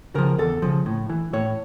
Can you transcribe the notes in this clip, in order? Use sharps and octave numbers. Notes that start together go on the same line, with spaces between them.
C#3 F3 A#4
E2 A4
C#3 F3
A2
E3
A2 C#5